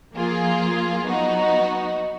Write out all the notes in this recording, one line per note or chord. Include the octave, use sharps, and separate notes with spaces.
F3 A#3 F4 G#4
F#3 B3 D#4 F#4